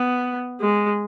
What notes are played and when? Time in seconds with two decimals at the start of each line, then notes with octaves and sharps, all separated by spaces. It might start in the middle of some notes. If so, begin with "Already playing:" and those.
Already playing: B3
0.60 G#3